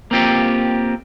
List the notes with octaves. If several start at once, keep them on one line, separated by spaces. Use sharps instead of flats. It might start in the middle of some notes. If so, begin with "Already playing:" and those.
A#3 C4 F4 G4